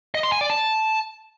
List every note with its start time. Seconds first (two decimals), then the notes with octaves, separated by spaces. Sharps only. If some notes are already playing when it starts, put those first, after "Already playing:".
0.15 D#5
0.23 C6
0.32 G#5
0.41 D5
0.50 A5